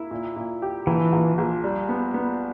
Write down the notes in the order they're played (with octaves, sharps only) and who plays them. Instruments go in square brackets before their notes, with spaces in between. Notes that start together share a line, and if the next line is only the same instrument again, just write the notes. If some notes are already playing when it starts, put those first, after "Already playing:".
Already playing: [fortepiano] A#3 E4
A#2
A#2
G4
[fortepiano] A#1 [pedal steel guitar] E3
[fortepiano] A#1
A#1
G3
B3
B3